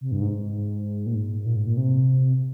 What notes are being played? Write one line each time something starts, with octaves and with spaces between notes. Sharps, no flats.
C3
G2
G#2
A#2
G#2
A#2
G#2
A#2
C3